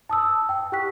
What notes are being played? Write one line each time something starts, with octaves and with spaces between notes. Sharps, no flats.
A5 D#6 E6
G5
G4 F#5 G5 C#6 F#6 B6